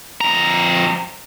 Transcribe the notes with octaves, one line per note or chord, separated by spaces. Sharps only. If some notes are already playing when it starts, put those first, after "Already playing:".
F2 A#5